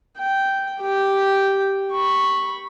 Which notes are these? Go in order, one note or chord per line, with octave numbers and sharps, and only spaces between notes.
G5
G4 G5
B5 C#6